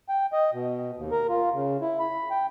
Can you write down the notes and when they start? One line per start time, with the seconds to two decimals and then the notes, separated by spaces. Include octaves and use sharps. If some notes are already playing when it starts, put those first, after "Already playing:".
0.09 G5
0.33 D#5
0.53 B2
0.97 D#2
1.11 A#4
1.29 F4
1.54 C#3
1.81 E4
1.99 B5
2.30 G5